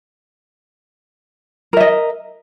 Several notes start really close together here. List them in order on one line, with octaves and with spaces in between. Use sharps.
A#4 E5 D#5